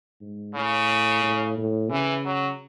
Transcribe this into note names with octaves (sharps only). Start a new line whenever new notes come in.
G#2
A2 C#3
A2
A2
C#3 E3
F#3